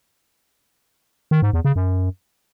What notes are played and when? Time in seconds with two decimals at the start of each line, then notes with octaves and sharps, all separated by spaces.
1.31 D#3
1.42 G#2
1.53 E2
1.65 C#3
1.76 F#2